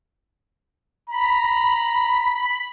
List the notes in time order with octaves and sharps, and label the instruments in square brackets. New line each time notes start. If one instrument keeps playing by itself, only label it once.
[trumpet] A#5 [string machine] B5